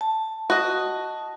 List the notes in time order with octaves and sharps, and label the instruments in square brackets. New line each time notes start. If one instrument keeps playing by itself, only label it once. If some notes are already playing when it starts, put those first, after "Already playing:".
[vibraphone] A5
[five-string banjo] F#4 D#5